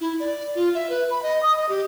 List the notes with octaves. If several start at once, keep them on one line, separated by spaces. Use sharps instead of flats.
E4
D5
F4
E5
B4
B5
D#5
D#6
D#5
G4